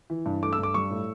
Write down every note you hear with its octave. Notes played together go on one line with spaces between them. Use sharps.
E3
G2
A3 D6
E6
G2 D6
G3 C#6
A2